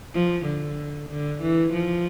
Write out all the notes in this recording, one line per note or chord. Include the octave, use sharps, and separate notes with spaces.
F3
D3
D3
E3
F3